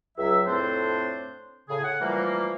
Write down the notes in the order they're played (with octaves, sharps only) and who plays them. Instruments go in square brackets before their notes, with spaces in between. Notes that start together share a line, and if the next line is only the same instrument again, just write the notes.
[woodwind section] C#2 F#3 E5
F2 A2 A3 C4 D4 C5
A2 C#3 G#4
F#5
E3 F3 G3 A3 A#3